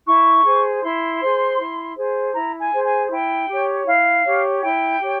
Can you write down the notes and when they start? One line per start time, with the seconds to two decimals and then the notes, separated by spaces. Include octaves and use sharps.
0.07 E4 C#6
0.45 G#4 C5
0.83 E4 C6
1.21 G#4 C5
1.59 E4
1.97 G#4 C5
2.34 E4 A#5
2.60 G#5
2.73 G#4 C5
2.85 G#5
3.11 E4 G5
3.49 G4 C#5
3.86 E4 F5
4.25 G4 C#5
4.62 E4 G5
5.00 G4 C#5